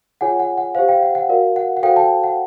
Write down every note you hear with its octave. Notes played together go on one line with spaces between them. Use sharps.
F4 G#4 C#5 F#5 G#5
F#5
F#5
G4 C5 F5
F5 G5
F#5
F#5
F#4 A#4 D5 F5
F#5
F#5
F#4 A4 C5 F5 G5
G5 A5
F#5